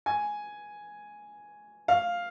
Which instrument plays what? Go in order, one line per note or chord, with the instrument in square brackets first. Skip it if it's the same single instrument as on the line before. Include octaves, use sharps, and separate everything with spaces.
[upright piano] G#5
F5